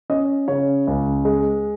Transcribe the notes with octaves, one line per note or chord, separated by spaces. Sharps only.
C#4 D#5
C#3 C#5
C#2
G#3